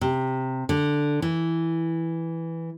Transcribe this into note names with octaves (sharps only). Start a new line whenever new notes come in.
C3
D3
E3